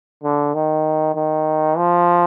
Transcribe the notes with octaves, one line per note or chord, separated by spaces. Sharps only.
D3
D#3
D#3
F3